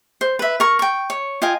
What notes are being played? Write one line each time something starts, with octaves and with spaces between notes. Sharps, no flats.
C5
B4 E5
A#4 C#6
G5 C#6
C#5
F4 D#5 G5 G#5